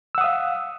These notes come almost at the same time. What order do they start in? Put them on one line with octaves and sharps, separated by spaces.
E6 F#5 D#6 F5